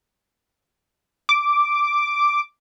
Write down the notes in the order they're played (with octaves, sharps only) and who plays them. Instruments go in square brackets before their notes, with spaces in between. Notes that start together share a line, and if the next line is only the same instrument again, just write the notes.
[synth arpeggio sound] D6